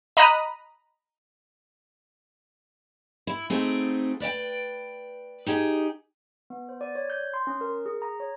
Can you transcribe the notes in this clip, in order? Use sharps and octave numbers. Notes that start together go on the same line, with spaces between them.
D#5 A#5 B5 D#6 F#6 D#7
E4
A3 C4 D#4 F#4 G#4
B4 D5 E5 G5
D#4 G4 G#4
B3
C5
D5
C#5
G6
C6
C#4
A#4
G#4
A#5
C#5